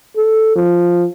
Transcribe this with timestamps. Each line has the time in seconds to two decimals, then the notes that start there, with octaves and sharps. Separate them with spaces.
0.17 A4
0.56 F3